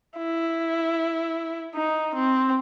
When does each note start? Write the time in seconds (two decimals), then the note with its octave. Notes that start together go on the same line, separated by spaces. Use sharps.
0.18 E4
1.75 D#4
2.15 C4